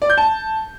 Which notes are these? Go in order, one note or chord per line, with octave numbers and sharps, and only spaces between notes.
D5
G6
A5